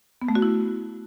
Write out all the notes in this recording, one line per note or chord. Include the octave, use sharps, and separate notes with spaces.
B3
A3
F#4
E4